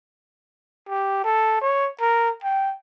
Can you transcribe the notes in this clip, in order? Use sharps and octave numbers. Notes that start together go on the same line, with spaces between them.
G4
A4
C#5
A#4
G5